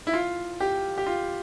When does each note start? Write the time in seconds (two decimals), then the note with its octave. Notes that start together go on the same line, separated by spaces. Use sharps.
0.07 E4
0.14 F4
0.60 G4
0.98 G4
1.07 F4